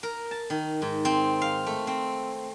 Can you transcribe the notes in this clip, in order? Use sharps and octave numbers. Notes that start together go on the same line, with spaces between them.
A#4
A5
D#3
G#2
C4
F5
A3
C4